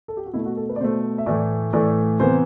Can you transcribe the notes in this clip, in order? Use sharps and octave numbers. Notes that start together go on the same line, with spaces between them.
A4
G4
F#4
B2 A3 E4
F#4
A4
B4
D5
B2 A3 C5
E5
A2 E3 A3 D5
A2 E3 A3 D5
C3 E3 B3 C5